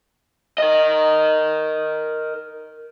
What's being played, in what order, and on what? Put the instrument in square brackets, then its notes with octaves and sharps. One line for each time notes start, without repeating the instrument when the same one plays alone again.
[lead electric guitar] A#4 D#5